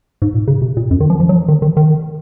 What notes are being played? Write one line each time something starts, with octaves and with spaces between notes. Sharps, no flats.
G#2
A#2
C#3
C3
A#2
F#2
D#3
F3
F3
F#3
F3
D#3
D#3
D#3